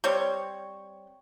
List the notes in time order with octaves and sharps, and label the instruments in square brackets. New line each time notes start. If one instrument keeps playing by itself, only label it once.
[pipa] G3 C4 C#5